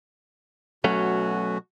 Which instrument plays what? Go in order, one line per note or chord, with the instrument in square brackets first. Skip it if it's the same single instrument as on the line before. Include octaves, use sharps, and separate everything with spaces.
[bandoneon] B2 F#4 [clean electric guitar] F#3 A3 C#4